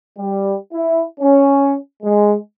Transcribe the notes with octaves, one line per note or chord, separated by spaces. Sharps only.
G3
E4
C#4
G#3